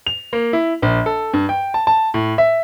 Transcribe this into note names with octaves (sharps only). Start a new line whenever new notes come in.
F7
A#3
E4
A#1
A4
G2
G5
A5
A5
A2
E5